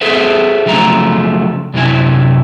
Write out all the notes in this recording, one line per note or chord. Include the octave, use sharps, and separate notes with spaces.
G#4 A4 B4 C5 E5
C#3 F3 F#3 A3 A#5
F#2 C3 E4 G4 G#5